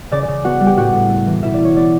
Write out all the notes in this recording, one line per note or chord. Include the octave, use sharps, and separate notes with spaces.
C#3 D5
D5
C#3
B3 F#4 F#5
G3
G4 G5
A2 F#4 F#5
A2
A3
E3
B2 E4 E5
D5
B2 C#5
B3 D5